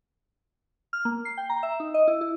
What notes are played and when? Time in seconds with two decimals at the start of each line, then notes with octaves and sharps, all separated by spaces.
0.93 F6
1.05 A#3
1.25 C7
1.38 G5
1.50 A#5
1.63 E5
1.80 D#4
1.94 D#5
2.08 E4
2.21 E4